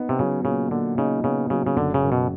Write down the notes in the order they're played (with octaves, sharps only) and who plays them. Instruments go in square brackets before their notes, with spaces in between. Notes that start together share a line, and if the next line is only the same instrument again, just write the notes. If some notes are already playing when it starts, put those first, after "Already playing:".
Already playing: [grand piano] B3 D#4
[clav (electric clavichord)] C3
[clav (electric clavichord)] C#3 [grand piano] F#3
[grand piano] A#2 [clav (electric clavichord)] C#3
[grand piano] A#2 [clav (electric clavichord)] D3
[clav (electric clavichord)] C#3 [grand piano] D#4
[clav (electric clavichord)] C#3 [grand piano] B3
[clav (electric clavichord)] C#3 [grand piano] F#3
[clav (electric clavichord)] C#3
[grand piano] F#1 [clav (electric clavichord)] D3
[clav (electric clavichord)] C#3
[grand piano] F#2
[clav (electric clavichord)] B2